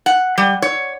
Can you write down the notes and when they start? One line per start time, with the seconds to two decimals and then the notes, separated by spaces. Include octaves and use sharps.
0.06 F#5
0.38 G3
0.62 C#5